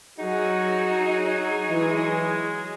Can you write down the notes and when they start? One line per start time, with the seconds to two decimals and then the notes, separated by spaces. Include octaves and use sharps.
0.19 F#3 D#4 F#4 G#4
1.68 E3 G#3